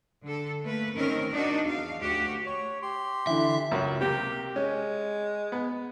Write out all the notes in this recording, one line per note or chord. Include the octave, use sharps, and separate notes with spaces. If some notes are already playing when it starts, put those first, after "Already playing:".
D3 A4
A3 A#3 B4
D#3 C4 C#4 A#4
D4 D#4 F#4
E2 F5
D2 F#4 G4
C#5
G4 C6
D3 E3 E5
C#2 F#2
C3 A#3 G4
G#3 C#4
B3